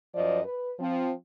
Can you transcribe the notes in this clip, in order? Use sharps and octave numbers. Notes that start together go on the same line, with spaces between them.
F#2 F3 D5 D#5
B4
F3 C4